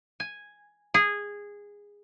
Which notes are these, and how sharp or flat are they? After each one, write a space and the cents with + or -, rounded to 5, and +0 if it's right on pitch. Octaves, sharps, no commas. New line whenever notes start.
G#5 -5
G#4 -15